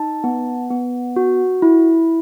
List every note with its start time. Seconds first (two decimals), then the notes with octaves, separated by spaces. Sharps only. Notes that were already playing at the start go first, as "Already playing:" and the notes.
Already playing: D#4 A5
0.24 B3
0.70 B3
1.16 F#4
1.62 E4